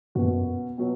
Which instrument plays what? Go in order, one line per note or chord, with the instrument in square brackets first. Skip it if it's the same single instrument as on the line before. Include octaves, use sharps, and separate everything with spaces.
[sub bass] F#2 [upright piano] B2 B3 F#4
[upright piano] B2 F#3 B3